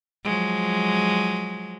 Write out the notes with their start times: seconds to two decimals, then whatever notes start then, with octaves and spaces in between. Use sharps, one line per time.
0.24 F3 F#3 G#3